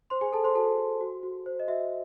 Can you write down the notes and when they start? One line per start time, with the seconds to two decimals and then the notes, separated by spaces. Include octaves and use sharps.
0.10 C5 C6
0.21 G#4 G#5
0.33 A4 A5
0.44 C5 C6
0.55 F#4 A4 A5
0.78 A4
1.01 F#4
1.23 F#4
1.46 C5
1.60 D#5
1.68 F#4 E5